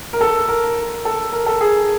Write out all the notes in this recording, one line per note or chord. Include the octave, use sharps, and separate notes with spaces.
A#4
A4
A#4
A4
A#4
A4
G#4